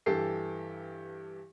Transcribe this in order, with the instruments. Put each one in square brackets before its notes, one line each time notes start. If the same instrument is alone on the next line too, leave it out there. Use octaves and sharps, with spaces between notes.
[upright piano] G2 E3 G4 A4 C7